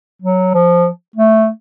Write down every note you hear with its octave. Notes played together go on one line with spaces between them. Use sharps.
F#3
F3
A3